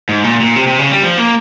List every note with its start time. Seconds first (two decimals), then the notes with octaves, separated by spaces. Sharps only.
0.09 G#2
0.24 A#2
0.40 A#2
0.56 C3
0.67 C3
0.79 C#3
0.91 G3
1.02 F3
1.18 A#3